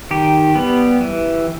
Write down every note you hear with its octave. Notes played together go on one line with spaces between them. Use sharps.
D#3 G4
G3 B3
E3